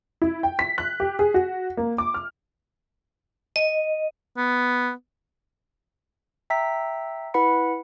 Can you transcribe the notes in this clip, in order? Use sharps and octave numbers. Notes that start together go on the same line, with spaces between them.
E4
G5
B6
F#6
G4
G#4
F#4
A#3
D6
F6
D#5
B3
E5 G5 A#5 E6 B6
E4 B4 F#5 B5 C#7